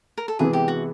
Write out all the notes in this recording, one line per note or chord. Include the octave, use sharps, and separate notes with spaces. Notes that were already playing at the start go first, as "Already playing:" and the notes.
A#4
A4
C3 E3 G#3 B3 G#4
G4
F#4